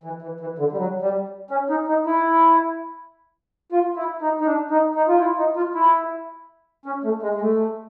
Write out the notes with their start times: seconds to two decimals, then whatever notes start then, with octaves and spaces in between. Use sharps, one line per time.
0.04 E3
0.22 E3
0.40 E3
0.59 D3
0.72 G3
0.77 F#3
1.02 G3
1.51 C#4
1.70 D#4
1.88 D#4
2.06 E4
3.72 F4
3.97 E4
4.21 D#4
4.41 D#4
4.46 D4
4.71 D#4
4.95 D#4
5.08 F4
5.20 E4
5.38 D#4
5.56 F4
5.75 E4
6.86 C#4
7.04 A3
7.22 G#3
7.34 G#3
7.41 A3